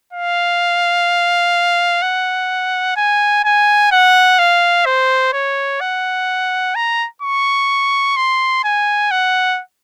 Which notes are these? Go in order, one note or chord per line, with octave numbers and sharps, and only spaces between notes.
F5
F#5
G#5
G#5
F#5
F5
C5
C#5
F#5
A#5
C#6
C6
G#5
F#5